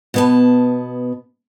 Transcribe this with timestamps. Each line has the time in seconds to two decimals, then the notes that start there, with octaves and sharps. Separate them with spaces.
0.14 B2 B3 A5